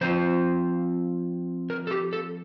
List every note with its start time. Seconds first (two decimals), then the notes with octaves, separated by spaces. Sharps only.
0.01 F3 C4 F4 C5
1.70 A#4
1.87 A4
1.91 G4
2.13 A4